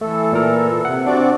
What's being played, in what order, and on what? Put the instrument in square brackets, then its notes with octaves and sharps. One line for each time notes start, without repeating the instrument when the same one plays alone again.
[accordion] E3 A4 [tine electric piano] A3
[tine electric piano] A#2 A#4
[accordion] C3 [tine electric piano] F#5
[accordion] C4 F#4 D5 [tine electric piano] D4